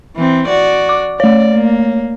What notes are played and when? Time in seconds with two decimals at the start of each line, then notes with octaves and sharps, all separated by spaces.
0.16 E3 C4
0.48 F#4 D5
0.89 D6
1.20 A3 C#5 D5
1.51 A#3